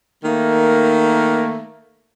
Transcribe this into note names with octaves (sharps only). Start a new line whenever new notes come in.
D#3 A3 A#3